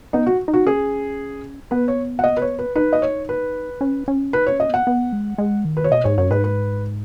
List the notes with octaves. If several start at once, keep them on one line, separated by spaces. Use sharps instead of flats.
B3 D#4
F#4
D#4
F#4
C#4 G#4
B3 B4
C#5
F#5
D#5
B4
C#5
B4
D#4 B4
D#5
C#5
B4
C#4
C#4
D#4 B4
C#5
C#4
D#5
B3 F#5
B3
G#3
G#3
D#3
B4
C#5
B2 D#5
G#2 C#5
F#2 C#5
G#2 B4
B4